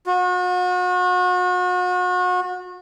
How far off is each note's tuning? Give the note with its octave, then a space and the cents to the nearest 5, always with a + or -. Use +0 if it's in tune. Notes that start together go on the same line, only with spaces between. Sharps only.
F#4 -40